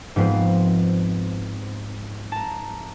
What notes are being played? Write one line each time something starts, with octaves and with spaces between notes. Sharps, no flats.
G#2 F3 B3 C4 B4 C5
A5 A#5